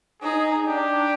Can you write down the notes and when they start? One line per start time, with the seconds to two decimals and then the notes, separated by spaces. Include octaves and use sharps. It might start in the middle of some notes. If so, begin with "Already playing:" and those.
0.22 D#4 G#4
0.66 D4 G4